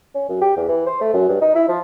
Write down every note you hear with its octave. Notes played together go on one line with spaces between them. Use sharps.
C#4
F#2
G4
E2
E3
C5
A3
F#2
G2
D#4
E4
F3